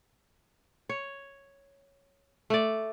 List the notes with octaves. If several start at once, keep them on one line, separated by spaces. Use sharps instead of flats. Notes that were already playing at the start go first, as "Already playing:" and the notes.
C#5
A3 D5